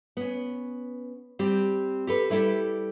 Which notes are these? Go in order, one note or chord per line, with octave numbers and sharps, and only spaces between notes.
B3 C#4
G3 C4 G4
G4 A4 B4
G3 E4 G4 A4